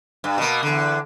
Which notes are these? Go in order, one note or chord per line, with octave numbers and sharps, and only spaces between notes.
G2
B2 A#3
E2 D3